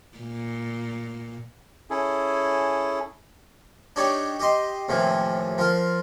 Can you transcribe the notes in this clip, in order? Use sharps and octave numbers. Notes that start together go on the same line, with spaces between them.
A#2
C#4 E4 G#4 A4
D4 D#4 G4 C#5 D5
G4 D#5 C6
D#2 A2 C3 E3 F3
F3 F4 A#4